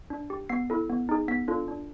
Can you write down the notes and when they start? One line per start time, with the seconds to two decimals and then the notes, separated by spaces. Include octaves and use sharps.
0.10 D4
0.30 G4
0.49 B3 C7
0.70 E4 A4
0.90 B3
1.09 D#4 G#4
1.28 B3 B6
1.48 D4 F4 A4
1.68 D4